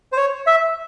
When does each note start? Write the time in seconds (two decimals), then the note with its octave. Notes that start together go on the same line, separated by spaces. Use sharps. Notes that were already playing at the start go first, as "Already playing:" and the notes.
0.12 C5
0.17 C#5
0.47 E5